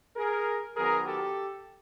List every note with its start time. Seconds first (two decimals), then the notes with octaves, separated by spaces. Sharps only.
0.16 G#4 A#4
0.76 D#3 F#3 B3 G#4 A#4
1.06 G4 A4